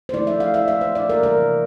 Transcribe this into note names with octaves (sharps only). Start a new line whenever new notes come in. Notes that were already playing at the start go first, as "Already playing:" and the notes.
C5
F3 A3 E4 D5
E5
F5
E5
E5
C5
D5
A#4
C3 E3 G3 A#4